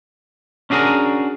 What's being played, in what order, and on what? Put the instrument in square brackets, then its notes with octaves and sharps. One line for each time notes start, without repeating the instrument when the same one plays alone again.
[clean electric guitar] C#4 D4 F#4 G#4 A#4